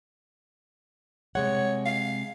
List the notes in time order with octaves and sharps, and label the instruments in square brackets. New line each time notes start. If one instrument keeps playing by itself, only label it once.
[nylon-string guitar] C3 G#3 F#5 [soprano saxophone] C#5
[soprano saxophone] F5